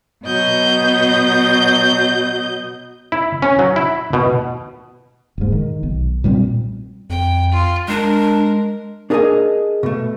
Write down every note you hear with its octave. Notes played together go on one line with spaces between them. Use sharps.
B2 F#3 D#5 G6
E4
C#4
F#3
E4
B2
D#1 G#2
D#3
B1
A#2 G3 A#3 C4
F2 G5
F4
G#3 D4 A#4
D4 G#4 A#4 D5 D#5 G#5
B2 A3